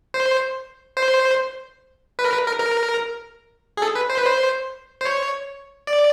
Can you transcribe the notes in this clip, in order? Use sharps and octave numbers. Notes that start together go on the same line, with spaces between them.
C5
C5
B4
A#4
B4
A#4
A#4
G#4
A4
B4
C5
B4
C5
C5
C#5
D5